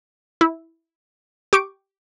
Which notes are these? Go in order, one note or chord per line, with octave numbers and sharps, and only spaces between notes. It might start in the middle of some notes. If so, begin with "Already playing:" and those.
E4
G4 C#6 D6 D7